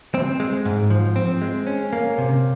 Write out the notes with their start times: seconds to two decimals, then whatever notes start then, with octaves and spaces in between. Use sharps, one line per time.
0.14 C4
0.40 G#3
0.65 G#2
0.90 F3
1.16 C4
1.42 G#3
1.67 C#4
1.93 A#3
2.18 C3